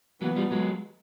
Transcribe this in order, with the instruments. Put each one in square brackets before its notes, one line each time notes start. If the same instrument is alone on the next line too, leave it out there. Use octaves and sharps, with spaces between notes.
[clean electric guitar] E3 F#3 [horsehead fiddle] B3
[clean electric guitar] F3 G3
F#3 G#3